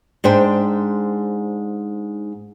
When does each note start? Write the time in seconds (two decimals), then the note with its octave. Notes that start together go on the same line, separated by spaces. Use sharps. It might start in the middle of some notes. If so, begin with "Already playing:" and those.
0.24 G#2 D4 C5 G5